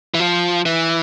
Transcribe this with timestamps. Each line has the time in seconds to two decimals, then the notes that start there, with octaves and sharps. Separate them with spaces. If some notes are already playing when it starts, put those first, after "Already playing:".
0.14 E3
0.20 F3
0.65 E3